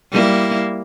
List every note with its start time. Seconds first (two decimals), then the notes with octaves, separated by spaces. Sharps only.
0.11 G3 A#3 E4